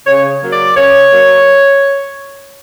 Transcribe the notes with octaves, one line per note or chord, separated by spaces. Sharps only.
C#3 C#5
F#3 A#3
D5
C#3 C#5
F#3 A#3